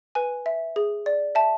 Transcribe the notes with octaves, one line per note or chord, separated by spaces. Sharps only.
B4 G#5
E5
G#4
D5
E5 A5